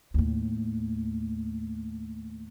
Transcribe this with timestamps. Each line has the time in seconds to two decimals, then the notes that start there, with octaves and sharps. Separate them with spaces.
0.14 D#2 A2